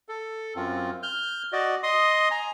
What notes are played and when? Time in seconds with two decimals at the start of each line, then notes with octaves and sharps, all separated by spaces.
0.09 A4
0.56 F#2 C4 F4
1.03 F6 G6
1.52 F#4 D5 D#5
1.83 D#5 C6 D#6
2.31 G#5 A#5